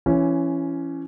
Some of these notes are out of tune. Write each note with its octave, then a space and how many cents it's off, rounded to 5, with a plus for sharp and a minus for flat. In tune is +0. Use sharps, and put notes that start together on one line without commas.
E3 +30 C#4 +0